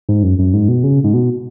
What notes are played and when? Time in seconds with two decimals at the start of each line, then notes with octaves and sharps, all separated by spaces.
0.09 G#2
0.23 F#2
0.39 F#2
0.54 G#2
0.69 B2
0.84 C#3
1.04 G#2
1.14 B2